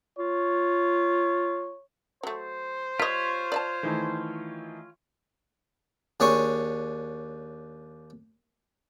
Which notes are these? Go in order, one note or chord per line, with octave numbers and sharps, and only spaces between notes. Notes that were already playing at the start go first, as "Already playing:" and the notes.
F4 C#5
F#3 A3 C5
G3 F4 C#5 D#5 B6
D5 E5 A5
D#3 E3 A3
D#2 D4 G#4 C#5 G#5 C#6